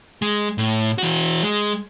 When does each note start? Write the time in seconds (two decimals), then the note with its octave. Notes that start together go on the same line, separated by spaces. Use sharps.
0.22 G#3
0.58 A2
0.98 E3 F#4
1.43 G#3